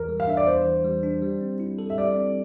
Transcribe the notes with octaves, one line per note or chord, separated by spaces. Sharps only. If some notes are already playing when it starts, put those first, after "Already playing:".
Already playing: E2 E3 A#4
G3
F5
D4 E5
D5
E2 C5
E3
G3
D4
G3
C4
E4
A4
E5
G3 D5
C4